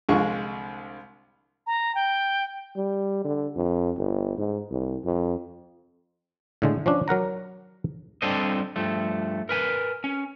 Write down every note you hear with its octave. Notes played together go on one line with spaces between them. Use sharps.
C2 D3 F3 G#3 C#6
A#5
G5
G3
D3
F2
G1
G#2
C2
F2
A2 D3 G#3
F3 C#4 D4
F#3 A#4 F#5 A#5
G3 C4 D4 A4 C5 D#5
G2 F3 A3
A#4 B4 G#5
C#4